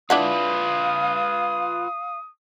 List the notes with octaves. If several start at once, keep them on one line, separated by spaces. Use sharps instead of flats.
D4 E4 F4 B4 F5 F#5 D#6